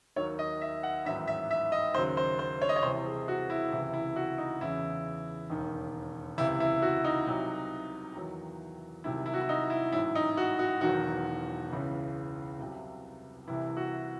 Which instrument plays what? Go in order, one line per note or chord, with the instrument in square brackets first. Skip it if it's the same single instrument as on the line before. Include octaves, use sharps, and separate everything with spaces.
[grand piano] D#2 D#3 F#3 C#5
D#5
E5
F#5
A1 G#2 D#3 F#3 E5
E5
E5
D#5
D#2 C#3 F#3 C5
C5
C5
C#5
D#5
C#5
C2 C3 E3 C5
G#4
F#4
E4
C#2 C3 E3 E4
E4
F#4
D#4
E2 C#3 E3 E4
E1 D#2 D#3
C#2 C3 E3 E4
E4
F#4
D#4
C2 C3 F#3
E2 D#3 F#3
C2 C3 D#3 F#3 E4
E4
F#4
E4
D#4
E4
A1 G#2 F#3 E4
D#4
F#4
F#4
E1 E2 D#3 F#3 F#4
C#2 C#3 E3
C2 C3 F#3
C2 C3 E3 E4
F#4